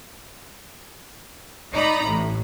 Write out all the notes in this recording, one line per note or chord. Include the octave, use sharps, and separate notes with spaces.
D#4 D5 A#5 B5
A1 A2